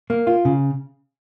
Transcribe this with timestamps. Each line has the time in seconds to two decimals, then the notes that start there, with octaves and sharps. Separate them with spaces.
0.10 A#3
0.27 F4
0.45 C#3